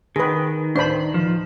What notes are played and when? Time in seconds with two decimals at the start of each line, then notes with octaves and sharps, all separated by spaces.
0.16 D#3 G#4 B4 G5 C6
0.75 D2 A2 D4 B4 C5 B5
1.14 F3